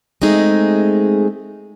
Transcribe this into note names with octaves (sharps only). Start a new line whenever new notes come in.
G#3 A3 C4 D#4 G#4